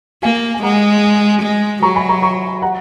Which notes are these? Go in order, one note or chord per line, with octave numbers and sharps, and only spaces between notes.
A#3 F5 G#5
G#5
G#3 F#5 A#5
G#3
F#3 A#5 C#6
G#5 B5
A#5 C#6
A#5 C#6
F#5 A#5